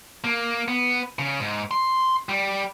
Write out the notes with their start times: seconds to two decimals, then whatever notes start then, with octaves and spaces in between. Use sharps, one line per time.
0.24 A#3
0.68 B3
1.19 C#3
1.40 G#2
1.71 C6
2.29 G3